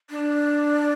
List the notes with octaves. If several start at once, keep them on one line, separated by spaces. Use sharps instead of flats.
D4